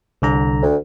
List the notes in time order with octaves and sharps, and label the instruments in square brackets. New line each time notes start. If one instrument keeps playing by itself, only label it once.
[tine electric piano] C2 D3 A#5
[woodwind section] D2